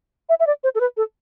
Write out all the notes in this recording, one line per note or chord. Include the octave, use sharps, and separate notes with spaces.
E5
E5
D5
C5
A4
B4
A4